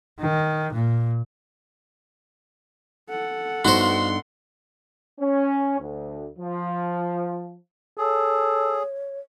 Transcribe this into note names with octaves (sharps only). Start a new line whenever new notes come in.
D#3
A#2
A4 F#5
G2 B3 D#4 F#4 C5 C6
C#4
D2
F3
G#4 A4 C#5